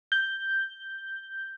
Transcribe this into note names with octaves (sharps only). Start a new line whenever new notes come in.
G6